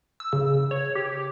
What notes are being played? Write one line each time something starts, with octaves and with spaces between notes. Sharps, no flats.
E6
C#3
C#5
G4